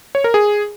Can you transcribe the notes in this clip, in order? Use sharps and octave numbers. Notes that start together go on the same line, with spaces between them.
C#5
A#4
G#4